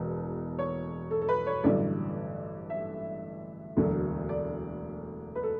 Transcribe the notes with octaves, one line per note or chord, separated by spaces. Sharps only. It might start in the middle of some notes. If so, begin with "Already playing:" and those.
Already playing: E1 E2 B2
C#5
A4
A4
B4
C#5
A1 G2 D3 F#3 D5
E5
E1 D2 D3 F#3
D5
B4
A4